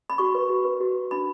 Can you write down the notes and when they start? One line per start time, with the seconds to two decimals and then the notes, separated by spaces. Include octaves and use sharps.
0.10 B5
0.18 F#4 C#6
0.35 B4
0.49 F#4
0.65 B4
0.80 F#4
0.96 B4
1.11 D4 B5